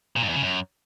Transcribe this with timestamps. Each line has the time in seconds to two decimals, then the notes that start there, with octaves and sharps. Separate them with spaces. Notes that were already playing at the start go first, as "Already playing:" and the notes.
0.16 A#2
0.23 G2
0.29 E2
0.36 C#3
0.42 F#2